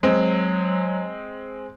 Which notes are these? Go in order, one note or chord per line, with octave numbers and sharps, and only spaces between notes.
F#3 G#3 C4